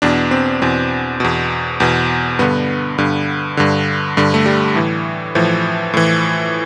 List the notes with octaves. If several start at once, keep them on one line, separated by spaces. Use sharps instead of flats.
E2 B2 D4
C4
E2 B2 C4
E2 B2
E2 B2
G2 D3 B3
G2 D3
G2 D3
G2 D3
A3
G3
A2 E3
A2 E3 F3
A2 E3